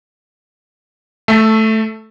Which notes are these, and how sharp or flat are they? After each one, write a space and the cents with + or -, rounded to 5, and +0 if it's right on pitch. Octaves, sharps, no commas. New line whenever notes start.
A3 +0 A4 +0 E5 +0